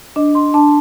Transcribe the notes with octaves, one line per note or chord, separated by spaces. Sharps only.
D4 D#5
C6
D4 A5